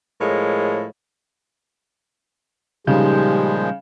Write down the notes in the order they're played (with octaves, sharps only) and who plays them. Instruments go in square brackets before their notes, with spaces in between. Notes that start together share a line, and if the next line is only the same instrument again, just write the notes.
[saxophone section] A2 F3 G#3 A#4 C#5
[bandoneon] A#2 F3 G#3 [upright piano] C#3 [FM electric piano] G3 D#4 G6 [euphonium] G4